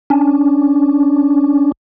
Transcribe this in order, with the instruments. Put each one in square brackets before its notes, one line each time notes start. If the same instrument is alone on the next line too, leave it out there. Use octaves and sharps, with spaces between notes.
[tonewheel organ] C#4 D4